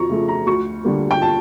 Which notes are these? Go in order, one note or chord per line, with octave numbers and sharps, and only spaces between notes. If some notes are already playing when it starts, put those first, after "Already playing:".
Already playing: F2 A#5 C#6
C#3 F3 A3
A#5
D2 C#6
D3 G3 A#3
G5
A5